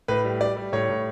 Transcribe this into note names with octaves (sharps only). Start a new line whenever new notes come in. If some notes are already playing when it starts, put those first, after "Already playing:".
A2 B4
G3
G3 D5
G3
A2 C#5
A2